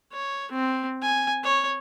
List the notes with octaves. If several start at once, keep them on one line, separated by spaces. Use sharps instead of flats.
C#5
C4
G#5
C#5